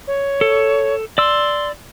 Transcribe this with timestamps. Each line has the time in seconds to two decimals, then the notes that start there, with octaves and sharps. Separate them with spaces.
0.07 C#5
0.41 A4
1.18 D5 C6 E6